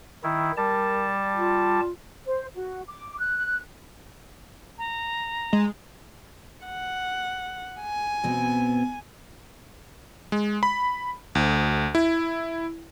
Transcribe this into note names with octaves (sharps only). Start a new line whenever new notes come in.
D#3 E4
G3 A#4 A5
F4
C5
F#4
D6
F#6
A#5
G#3
F#5
G#5
B2 B3 C4
G#3
B5
D2
E4